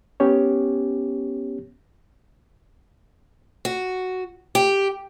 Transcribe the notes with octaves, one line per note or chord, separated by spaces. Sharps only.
B3 C#4 G4 C#5
F#4
G4